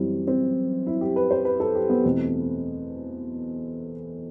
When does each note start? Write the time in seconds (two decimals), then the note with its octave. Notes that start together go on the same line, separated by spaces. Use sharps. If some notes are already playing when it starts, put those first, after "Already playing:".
Already playing: F#2 E3 G3 C4
0.27 C4
0.87 E4
1.01 G4
1.16 B4
1.31 C5
1.45 B4
1.60 A4
1.75 G4
1.90 B3
2.04 E2 B2 A3 C4